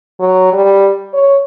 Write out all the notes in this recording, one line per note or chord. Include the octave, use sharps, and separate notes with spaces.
F#3
G3
C#5